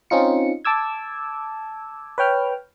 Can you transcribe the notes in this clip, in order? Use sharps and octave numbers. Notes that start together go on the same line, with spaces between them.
C4 C#4 D#4 F4 C#7
A5 D6 E6 G#6
B4 C#5 G5 F6